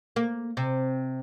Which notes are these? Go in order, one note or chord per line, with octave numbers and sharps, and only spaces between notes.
A#3
C3